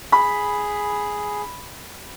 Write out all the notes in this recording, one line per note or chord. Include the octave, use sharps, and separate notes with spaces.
G#4 B5